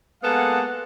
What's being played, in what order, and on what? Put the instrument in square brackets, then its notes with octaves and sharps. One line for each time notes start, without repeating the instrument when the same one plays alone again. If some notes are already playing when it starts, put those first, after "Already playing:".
[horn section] G#3 A#3 B3 A4 F5 F#5